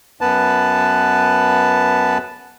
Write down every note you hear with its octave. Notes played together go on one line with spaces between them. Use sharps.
F#2 B3 B4 A5